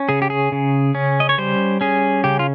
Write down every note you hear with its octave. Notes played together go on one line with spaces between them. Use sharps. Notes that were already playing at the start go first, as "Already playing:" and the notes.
Already playing: C#4
C#3 G#4
G4
G#4
C#3
C#4
D#5
C#5
G3 C5
C#4 G#4
C#3 G4
F4